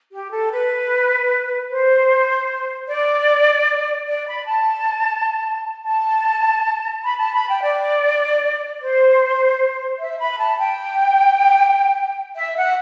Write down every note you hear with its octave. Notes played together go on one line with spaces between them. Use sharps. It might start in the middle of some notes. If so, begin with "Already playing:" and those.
G4
A4
B4
C5
D5
D5
B5
A5
A5
B5
A5
B5
G5
D5
C5
E5
B5
A5
G5
E5
F#5